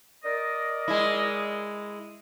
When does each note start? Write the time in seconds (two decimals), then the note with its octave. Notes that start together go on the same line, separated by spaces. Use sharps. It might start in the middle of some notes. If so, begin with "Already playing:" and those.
0.24 A#4 D5 D#5
0.88 G#3 E4